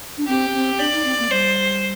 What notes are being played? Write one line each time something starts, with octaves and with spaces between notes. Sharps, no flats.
D4
C4 G4
C4
D4 D5
D#4
C4
A#3
G3 C5